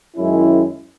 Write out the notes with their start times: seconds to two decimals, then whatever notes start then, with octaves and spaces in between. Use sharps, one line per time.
0.17 F#2 D#3 G#3 C#4 E4